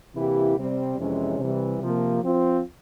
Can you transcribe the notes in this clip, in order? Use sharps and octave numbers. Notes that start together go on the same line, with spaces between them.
C3 E3 A#3 E4 G4
C3 G3 C4
F2 C3 E3 G#3 C#4
C3 E3 G3
C3 F3 A#3
F3 C4 F4